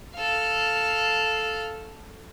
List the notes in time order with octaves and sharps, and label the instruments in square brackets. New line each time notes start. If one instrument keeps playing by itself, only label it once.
[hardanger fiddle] A4 F5